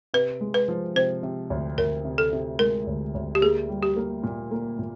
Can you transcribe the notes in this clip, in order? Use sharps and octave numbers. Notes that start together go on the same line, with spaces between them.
C3 B4
G#3
B4
F3
C3 C5
C3
D2
D2 A#4
C3
A4
C3
G#3 A#4
D2
D2
G4
A#3 G#4
G3
G4
A#3
A#2
A#3
A#2